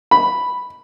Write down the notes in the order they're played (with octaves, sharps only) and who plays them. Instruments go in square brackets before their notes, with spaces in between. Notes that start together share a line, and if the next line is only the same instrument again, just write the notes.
[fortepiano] B5